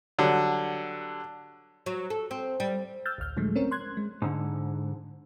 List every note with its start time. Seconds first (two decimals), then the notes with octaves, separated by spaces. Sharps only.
0.18 D3 F#3 G3
1.86 F#3
2.10 A4
2.31 C4
2.60 G3
3.05 E6 F6 G6 A6
3.18 A1 D2 F6 G6
3.37 A2 D3 F3 F#3 G#3 A3
3.56 C4 C#4 A#4 C#5
3.71 C6 F#6 G#6
3.97 G#3
4.22 G#2 D3